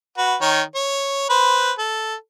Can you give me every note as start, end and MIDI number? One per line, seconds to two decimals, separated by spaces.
0.18 0.35 66
0.18 0.35 71
0.41 0.62 51
0.41 0.62 73
0.75 1.25 73
1.30 1.71 71
1.30 1.71 72
1.78 2.15 69